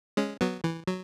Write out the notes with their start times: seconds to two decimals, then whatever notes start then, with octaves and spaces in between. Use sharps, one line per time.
0.17 G#3 C#4
0.41 F#3 B3
0.64 E3
0.88 F#3